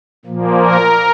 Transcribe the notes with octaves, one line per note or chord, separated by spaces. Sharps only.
A#2 F3 A#3
A#4